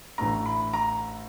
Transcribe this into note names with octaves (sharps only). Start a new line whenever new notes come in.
A1 A2 E3 A3 D4 A#5
B5
A#5